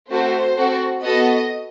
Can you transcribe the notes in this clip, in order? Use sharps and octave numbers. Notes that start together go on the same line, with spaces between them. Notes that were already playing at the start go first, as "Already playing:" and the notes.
A3 C4 F#4 A4 C5
C4 F#4 A4
B3 F#4 A4 D#5